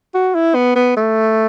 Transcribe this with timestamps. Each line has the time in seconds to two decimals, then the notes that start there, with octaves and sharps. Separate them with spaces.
0.14 F#4
0.35 E4
0.55 B3
0.76 B3
0.97 A3